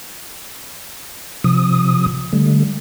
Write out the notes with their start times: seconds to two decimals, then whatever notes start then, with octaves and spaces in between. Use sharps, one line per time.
1.44 C3 F3 D#6
2.33 D3 G3 A3